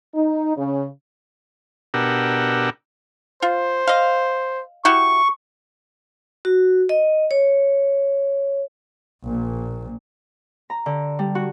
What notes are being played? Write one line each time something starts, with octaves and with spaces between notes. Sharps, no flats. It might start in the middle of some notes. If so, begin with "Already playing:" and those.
D#4
C#3
B2 D4 G4 A#4 F#5 E6
F4 C5
D#5 F5
E4 F#4 G4 C#6
F#4
D#5
C#5
A#1 A#2
A#5
D3
G3
F#4